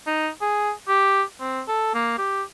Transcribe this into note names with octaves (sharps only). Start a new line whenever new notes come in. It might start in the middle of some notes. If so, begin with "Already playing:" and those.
D#4
G#4
G4
C4
A4
A#3
G4